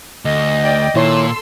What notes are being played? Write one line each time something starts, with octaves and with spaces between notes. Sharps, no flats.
D2 D#5
D5 G5
A#2 D#3 E4 A4 C#5 C6 E6